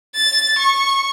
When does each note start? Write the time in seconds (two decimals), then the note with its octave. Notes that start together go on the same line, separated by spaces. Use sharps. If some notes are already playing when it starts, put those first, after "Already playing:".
0.15 A6
0.58 C#6